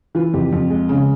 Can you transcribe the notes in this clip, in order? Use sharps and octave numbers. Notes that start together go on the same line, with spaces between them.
E3 F4
F2 G4
F2
G#3
C#3